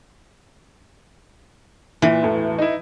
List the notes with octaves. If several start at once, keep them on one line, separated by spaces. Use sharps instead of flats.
A#2 E3
E1 A2
D#4 E4